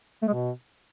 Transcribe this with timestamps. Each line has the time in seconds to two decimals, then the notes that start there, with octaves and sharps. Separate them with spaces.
0.22 A3
0.28 G#3
0.33 B2